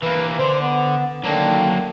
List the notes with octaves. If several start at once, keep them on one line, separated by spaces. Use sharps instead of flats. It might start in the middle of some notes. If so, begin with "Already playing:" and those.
E3 A#3 B4
D3 C5
B3
D3 D#3 F#3 A#3 D4